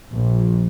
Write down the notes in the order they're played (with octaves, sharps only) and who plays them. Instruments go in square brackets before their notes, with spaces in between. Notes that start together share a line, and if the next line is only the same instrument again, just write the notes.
[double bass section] A#1